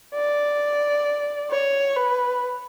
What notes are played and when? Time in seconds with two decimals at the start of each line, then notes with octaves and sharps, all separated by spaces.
0.15 D5
1.51 C#5
1.97 B4